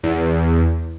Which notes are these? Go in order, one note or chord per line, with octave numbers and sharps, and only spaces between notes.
E2